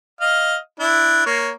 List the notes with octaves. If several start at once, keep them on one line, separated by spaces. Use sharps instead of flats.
D#5 F5
D4 E4
A#3 C#5